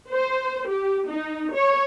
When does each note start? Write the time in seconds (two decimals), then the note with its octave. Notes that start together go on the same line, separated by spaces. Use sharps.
0.10 C5
0.69 G4
1.09 D#4
1.54 C#5